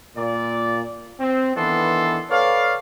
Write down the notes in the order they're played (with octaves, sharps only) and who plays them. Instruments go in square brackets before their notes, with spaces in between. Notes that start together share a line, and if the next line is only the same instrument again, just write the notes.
[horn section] A#2 D5
C4
D#3 E3 B3 D4 A4 C6
A4 B4 C#5 D5 F5